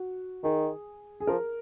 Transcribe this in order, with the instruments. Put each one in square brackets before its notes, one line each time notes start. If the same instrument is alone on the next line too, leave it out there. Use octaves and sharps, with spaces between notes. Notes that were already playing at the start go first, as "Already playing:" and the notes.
Already playing: [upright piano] F#4
[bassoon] D#3 [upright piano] G#4
[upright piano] G#4
[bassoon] F3 [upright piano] A#4